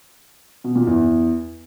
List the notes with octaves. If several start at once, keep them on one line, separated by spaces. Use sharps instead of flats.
B2
A#2
E2